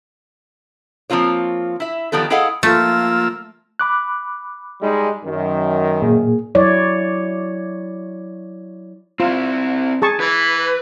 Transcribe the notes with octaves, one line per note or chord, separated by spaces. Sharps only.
F3 A#3 C4 F4 C#5
E4 E5
D#3 F3 G3 B3 A4
E4 G#4 A4 D#5 F5 F#5
F3 A3 A#3 F4 E6
B5 D6 F#6
G3 G#3 D#4
F#2 D#3
A#2 A#3 G#4
F#3 E4 C#5 D5
C4 E4 F4
G#4 A5 C#6
E3 B4